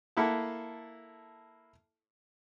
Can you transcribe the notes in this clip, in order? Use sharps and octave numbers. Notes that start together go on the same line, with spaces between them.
A#3 E4 A4 F#5 A5